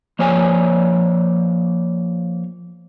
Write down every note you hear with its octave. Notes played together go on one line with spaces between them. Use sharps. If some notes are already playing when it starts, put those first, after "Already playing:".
F3 A#3 C#5 D5 G#5